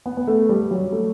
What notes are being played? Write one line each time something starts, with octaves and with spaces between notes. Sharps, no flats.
B3
B3
A3
G3
F#3
A3